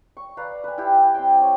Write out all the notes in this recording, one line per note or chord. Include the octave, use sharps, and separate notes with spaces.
C#6
B4 D5 F5 A#5
B4 G#5
E4 G4
C4 C5 G5
C#5